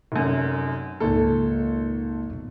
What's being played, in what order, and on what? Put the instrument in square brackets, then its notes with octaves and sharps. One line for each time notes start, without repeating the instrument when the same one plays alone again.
[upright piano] F1 F#2
[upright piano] G#1 A4 [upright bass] C#2 A#2
[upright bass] F2 B2